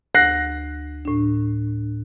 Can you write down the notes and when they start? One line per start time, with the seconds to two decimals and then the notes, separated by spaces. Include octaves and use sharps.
0.15 D2 F#6 A#6 C7
1.05 A2 D4